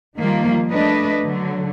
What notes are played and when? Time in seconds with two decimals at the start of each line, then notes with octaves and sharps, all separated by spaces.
0.17 D#3 F3 G3 A#3 F4
0.70 A3 D4 B4 D#5
1.24 D3 F#3